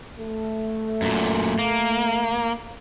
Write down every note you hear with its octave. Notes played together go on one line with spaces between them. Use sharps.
A3
F#2 A#2
A#3